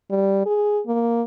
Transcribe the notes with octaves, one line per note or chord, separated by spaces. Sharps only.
G3
G#4
A#3